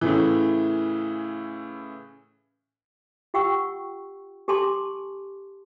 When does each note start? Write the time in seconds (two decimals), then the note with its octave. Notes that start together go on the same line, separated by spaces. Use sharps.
0.01 A2 C#3 E3
3.34 F4 G4 F#5 G5 C#6 E6
4.48 G4 A4 G#5 A5 C6 D6